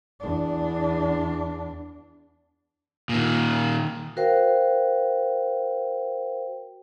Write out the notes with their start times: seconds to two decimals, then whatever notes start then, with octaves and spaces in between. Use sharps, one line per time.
0.20 E2 D4
3.09 A#2 D#3
4.17 F#4 A#4 C5 F5 G5